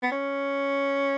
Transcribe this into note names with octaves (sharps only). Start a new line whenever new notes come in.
B3
C#4